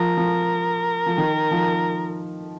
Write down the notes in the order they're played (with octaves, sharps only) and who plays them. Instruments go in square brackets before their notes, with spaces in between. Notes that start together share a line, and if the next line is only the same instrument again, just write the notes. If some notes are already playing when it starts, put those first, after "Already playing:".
Already playing: [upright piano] F3 [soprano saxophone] A#4
[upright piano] F3
F3
D#3
F3